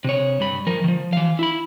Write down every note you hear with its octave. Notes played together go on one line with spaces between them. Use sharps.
C3 C#5
G2 B5
F3 A#4
D#3 F3
E3 F5
E4 B5